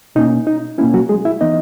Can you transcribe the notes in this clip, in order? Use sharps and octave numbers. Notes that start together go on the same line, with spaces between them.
B2 A#3 C#4 D#4
D#4
B2 A#3 C#4 E4
F#3 F#4
G#3 G#4
E4 E5
E3 B3 D#4 D#5